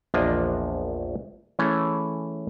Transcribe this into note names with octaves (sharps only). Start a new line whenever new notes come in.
A#1 E2 F3 A#3 D4 D#5
E3 A3 C#4 G#4 A4